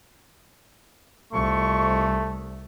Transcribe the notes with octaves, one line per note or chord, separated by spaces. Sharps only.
C2 F2 A3 C6 C#6